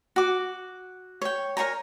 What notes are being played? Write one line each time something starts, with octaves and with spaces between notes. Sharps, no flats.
F#4 D6
C#5 G5
A#4 C#5 G#5 A#5